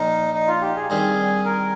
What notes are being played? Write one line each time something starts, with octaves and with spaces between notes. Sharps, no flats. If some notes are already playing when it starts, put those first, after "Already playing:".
Already playing: A#2 F3 A#3 D#4
D#4
F4
G4
G#4
G2 D#3 G3 C4 F4 G#4
A#4